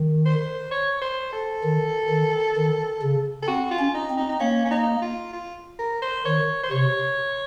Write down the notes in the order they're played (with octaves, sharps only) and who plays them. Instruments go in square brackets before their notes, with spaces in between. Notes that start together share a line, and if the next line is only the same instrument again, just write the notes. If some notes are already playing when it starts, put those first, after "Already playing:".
Already playing: [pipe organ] D#3
[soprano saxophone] C5
C#5
C5
A4
[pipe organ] D#3
D#3
D#3
C#3
[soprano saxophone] A4
[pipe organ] C4 [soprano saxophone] F#4
[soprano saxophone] F4
[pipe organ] C#4
[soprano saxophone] D#4
[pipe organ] C4
[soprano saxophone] D#4
D#4
[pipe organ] A#3 [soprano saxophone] C#4
[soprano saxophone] C#4
D#4
F4
F4
A#4
C5
[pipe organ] D#3 [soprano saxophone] C#5
[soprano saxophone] C5
[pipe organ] C3 [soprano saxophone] C#5